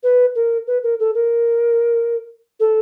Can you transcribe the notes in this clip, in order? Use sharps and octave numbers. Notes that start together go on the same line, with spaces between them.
B4
A#4
B4
A#4
A4
A#4
A4